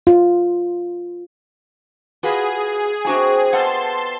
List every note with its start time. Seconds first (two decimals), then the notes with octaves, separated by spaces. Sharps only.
0.07 F4
2.23 F4 F#4 G#4 B4
3.05 C3 F3 D4 F#4 G#5
3.53 B2 A4 F#5 A5 C6